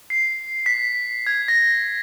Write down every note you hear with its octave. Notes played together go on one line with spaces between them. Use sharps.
C7
B6
G#6
A#6